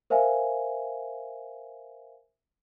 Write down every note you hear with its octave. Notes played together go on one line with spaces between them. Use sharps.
A#4 C5 E5 F5 G#5